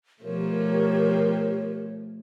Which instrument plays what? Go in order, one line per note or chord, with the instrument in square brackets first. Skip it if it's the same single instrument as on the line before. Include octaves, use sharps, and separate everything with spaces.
[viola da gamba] B2 F3 A3 [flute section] G4 A#4 C#5